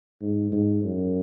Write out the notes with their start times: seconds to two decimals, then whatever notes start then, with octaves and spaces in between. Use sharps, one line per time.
0.22 G#2
0.52 G#2
0.84 F#2